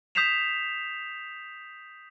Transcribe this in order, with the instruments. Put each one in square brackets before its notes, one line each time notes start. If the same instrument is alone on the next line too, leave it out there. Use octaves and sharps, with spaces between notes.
[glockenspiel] D#6 G6 B6 C7 E7 F7